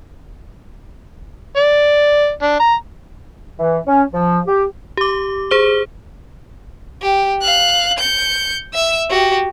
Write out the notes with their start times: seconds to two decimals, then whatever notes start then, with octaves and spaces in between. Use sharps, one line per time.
1.57 D5
2.42 D4
2.60 A#5
3.59 E3
3.87 C#4
4.14 F3
4.47 G4
4.97 G4 D6
5.51 G#4 C5 G7
7.02 G4
7.42 F5 F#6
7.98 G6 C#7
8.73 E5 E6
9.10 F#4 G4